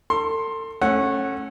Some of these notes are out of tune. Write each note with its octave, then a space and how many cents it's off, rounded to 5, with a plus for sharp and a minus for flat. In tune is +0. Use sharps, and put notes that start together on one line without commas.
A4 +35 C6 +15
A3 +0 C#4 -20 F#5 +0